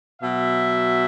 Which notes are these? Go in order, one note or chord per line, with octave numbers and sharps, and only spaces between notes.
B2 F#3 E5